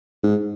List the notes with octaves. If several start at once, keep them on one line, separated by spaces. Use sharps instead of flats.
G#2